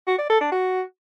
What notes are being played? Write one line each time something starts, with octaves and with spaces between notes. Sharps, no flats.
F#4
D5
A4
D4
F#4